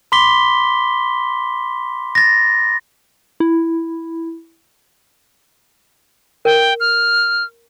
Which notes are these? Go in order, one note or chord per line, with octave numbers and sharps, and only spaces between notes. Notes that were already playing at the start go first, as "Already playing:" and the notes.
B5 C6 D6 B6 G7
A6 A#6
E4
A#4 G5
F6